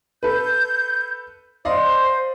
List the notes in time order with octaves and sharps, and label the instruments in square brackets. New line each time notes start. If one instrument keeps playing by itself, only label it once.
[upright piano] A4 B4 [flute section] G6
[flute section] C5 C6 [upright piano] D5 D#5 F5